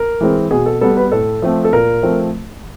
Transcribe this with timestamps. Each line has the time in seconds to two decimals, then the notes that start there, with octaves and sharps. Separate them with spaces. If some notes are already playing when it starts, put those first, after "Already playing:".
Already playing: A#4
0.21 E3 G#3 C4
0.51 B2 G#4
0.66 A4
0.81 G3 B3 A4
0.97 B4
1.11 A2 A4
1.42 F3 A3 C4
1.65 A4
1.73 A#2 A#4
2.03 F3 A3 C4